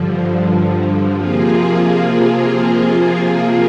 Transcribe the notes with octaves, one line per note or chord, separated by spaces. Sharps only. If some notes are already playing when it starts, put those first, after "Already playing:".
Already playing: G2 D3 F3
C3 F3 A#3 F4 G#4